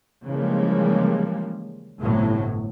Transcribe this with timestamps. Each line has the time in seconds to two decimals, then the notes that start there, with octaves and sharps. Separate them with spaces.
0.26 C#3 E3 F3 G3 G#3 A#3
2.00 G1 A2 C3 F#3